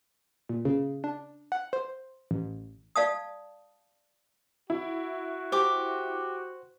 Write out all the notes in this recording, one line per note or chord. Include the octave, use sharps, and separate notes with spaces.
A#2
C#3
D4
F#5
C5
A1
D5 F5 A5 D#6
E4 F#4
G4 C5 D6